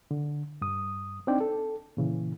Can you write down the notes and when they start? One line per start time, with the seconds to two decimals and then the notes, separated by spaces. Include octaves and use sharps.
0.11 D3
0.61 G2 D#6
1.27 C4 D4 D#4 D5 G5
1.40 A4
1.97 A#2 C#3 E3